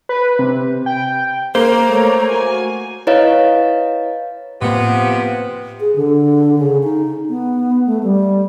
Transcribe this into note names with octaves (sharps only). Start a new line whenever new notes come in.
B4
C3
G5
A#3 C5 A#5
A3 C#5
F#4 G#5
E4 B4 C#5 D#5 F5
A2 C3 F3 A#3 B3
G#4
D3
C#3
D#4
B3
A3
G3